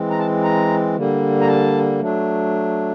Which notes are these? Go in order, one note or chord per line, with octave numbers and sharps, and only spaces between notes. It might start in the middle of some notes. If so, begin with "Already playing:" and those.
Already playing: E3 G#3 C4
A#5
A5
A#5
D3 G3 A#3
A#5
A5
F#3 A3 D4